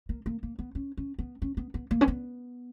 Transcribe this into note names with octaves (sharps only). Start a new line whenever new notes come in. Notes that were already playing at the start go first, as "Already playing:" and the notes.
A#3
A#3
A#3
B3
C#4
C#4
B3
C#4
B3
B3
A#3
C#4
B3